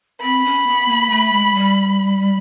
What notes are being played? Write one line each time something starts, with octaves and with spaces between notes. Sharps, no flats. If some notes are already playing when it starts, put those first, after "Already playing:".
C4 B5
C#4
B3
A#3
A3
G#3
G3